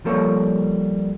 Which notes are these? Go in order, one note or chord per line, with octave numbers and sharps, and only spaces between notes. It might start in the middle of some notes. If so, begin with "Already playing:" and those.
F3 G3 A#3 A4 C#5